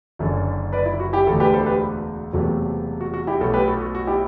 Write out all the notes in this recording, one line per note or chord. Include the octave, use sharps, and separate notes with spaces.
F#1 F#2 D3
B4 D5
E4
F#4
E4 G4
E1 D2 D3 F#4 A4
G4 B4
A4 C5
G4 B4
E1 E2 C3 F#3 A3
F#4
F#4
E4 G4
B1 B2 A3 F#4 A4
G4 B4
F#4 A4
F#4
F#4
E4 G4